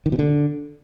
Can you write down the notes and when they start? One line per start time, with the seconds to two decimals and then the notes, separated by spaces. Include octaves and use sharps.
0.06 D#3
0.12 B2
0.19 D3